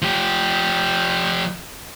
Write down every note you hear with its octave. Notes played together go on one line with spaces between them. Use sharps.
F3 G4